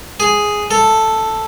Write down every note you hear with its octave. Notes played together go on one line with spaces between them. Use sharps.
G#4
A4